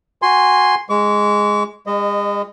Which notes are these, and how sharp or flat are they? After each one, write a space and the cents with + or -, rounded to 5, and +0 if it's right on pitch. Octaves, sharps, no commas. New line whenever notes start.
F#4 +0 G#5 -10 C6 +0
G#3 +0 C#6 +45
G#3 -40 D#5 -15